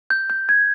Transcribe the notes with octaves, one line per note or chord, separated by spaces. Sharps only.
G6
G6
G#6